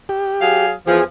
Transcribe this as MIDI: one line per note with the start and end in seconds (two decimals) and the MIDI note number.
0.09 0.66 67
0.41 0.71 54
0.41 0.71 68
0.41 0.71 77
0.88 1.01 40
0.88 1.01 53
0.88 1.04 68